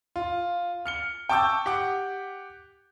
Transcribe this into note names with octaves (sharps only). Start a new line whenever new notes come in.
F4
F6 C#7 G7
G5 A5 C#6 D6 E6 G6
G4 F#5 D6